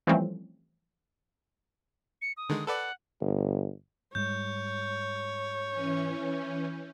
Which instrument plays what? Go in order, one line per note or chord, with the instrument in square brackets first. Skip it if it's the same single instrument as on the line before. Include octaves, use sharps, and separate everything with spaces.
[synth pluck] E3 F3 G3 A3 C4 C#4
[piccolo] C#7
D#6
[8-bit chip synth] D3 D#3 G#3
[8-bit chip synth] A4 B4 D5 [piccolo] F#5
[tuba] G1
[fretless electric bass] G#2 G3 G#3 [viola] C#5 [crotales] G6
[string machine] E3 C#4